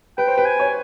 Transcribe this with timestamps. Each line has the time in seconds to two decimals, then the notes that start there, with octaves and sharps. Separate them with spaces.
0.18 B4 G5
0.28 C5
0.38 B4
0.46 G#5
0.60 C#5